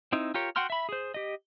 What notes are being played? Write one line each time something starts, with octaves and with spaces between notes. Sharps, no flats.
C4 D#4 E4
F4 G4 A#4 C#5
F#4 F#5 G5 C6 F6
E5 B5
G#4 C5
G4 D#5